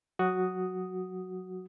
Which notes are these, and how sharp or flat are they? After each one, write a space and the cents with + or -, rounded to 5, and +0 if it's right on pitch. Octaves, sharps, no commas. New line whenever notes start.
F#3 -15 F#4 +0 D#6 +0